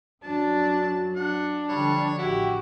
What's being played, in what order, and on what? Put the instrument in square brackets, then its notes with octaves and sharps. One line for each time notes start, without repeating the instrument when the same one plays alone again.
[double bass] F#2 F#3 [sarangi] D4 [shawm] A5
[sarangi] D4 [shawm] F#5
[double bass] D3 F3 [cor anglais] G3 [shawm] C#5
[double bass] A1 [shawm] E4 [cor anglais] F#4 [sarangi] G4